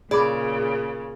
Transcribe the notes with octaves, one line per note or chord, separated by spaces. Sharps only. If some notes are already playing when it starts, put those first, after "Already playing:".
A#2 C#3 G#4 D5 B5 D6